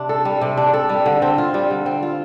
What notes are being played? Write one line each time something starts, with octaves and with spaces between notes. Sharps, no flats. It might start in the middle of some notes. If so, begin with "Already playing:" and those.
Already playing: C3 D4
A4
G3
C3
D4
A4
G3
D3
C4
F4
G3
D3
C4
F4